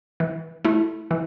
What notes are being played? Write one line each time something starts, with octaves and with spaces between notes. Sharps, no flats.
E3
A3 E4
E3